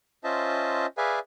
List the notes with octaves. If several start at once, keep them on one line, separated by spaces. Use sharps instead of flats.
C#4 F4 C5 D#5 E5 A5
G#4 B4 D5 E5 F5 G#5